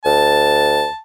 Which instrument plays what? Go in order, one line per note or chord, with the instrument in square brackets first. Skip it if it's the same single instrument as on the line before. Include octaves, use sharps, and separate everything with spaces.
[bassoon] D2 [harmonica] A5